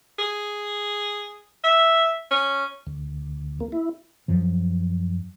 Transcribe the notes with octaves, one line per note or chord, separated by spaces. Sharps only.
G#4
E5
C#4
D2
A#3
E4
F#2 F3 F#3